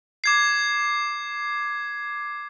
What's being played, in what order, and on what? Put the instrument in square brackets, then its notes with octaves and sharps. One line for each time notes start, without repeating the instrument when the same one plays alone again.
[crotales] D6 G#6 C7